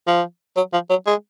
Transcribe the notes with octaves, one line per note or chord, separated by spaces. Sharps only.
F3
F#3
F3
F#3
G#3